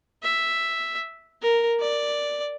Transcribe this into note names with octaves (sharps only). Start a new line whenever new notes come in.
E5
A#4
D5